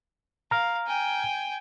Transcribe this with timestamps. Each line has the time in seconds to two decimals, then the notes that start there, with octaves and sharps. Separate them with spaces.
0.51 F5 A#5 F6
0.87 G5 G#5